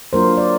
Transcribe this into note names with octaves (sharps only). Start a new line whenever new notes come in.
F#3 A#3 D4 F4 A#4 C5
D5